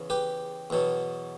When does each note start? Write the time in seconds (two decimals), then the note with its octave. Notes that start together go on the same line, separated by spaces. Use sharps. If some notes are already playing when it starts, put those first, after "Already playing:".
Already playing: E2 C#3
0.10 G4 B4
0.70 E2 B2 F#3